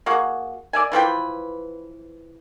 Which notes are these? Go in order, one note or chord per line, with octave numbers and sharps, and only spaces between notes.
A#3 F#4 G#4
D5 E5 G#5
E3 F3 B4 G5